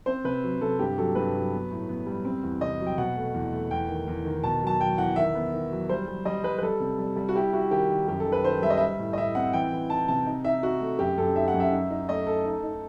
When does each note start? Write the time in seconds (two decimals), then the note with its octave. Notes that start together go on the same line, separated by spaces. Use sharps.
0.06 C4 C5
0.24 C3 B4
0.43 F#3
0.61 C3 A4
0.79 G2 G4
0.97 F#3 A4
1.15 G2 B4
1.34 F#3
1.52 B3
1.71 A2
1.89 B3
2.07 G3
2.25 C4
2.43 E2
2.61 C3 D#5
2.80 F#3
2.86 G5
2.98 B2 F#5
3.16 A3
3.34 E2
3.52 A3
3.71 E2 G5
3.89 D#3
4.08 E2
4.25 D#3
4.43 B2 A5
4.63 F#3 A5
4.80 F#3 G5
4.98 E2 F#5
5.16 D#3 E5
5.35 B3
5.53 D#3
5.71 F#3
5.89 G3 C5
6.08 G3
6.25 G3 D#5
6.44 G3 B4
6.58 B4
6.62 G3 A4
6.80 C3
6.99 G3
7.16 G3
7.29 F#4
7.35 E4 G4
7.53 E4 F#4
7.71 D#3 G4
7.90 D#3
8.08 F#2 G4
8.20 A4
8.26 D#3
8.32 B4
8.44 D#3 C5
8.62 G3 E5
8.70 D#5
8.77 G3 E5
8.99 A2
9.13 D#5
9.17 A2 E5
9.35 C4 F#5
9.53 E3 G5
9.72 E3
9.90 D#4 A5
10.08 C3 A5
10.26 D#4
10.45 D#4 E5
10.63 D#4 F#4
10.81 A3
10.99 F#2 G4
11.18 F#2 A4
11.36 D#4 E5
11.48 F#5
11.54 F#2
11.60 E5
11.72 D#4
11.91 D#4
12.08 A3 D#5
12.27 A3 A4
12.46 D#4
12.64 D#4